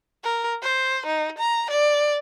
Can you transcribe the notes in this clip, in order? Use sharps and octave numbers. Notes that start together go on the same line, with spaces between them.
A#4
C5
D#4
A#5
D5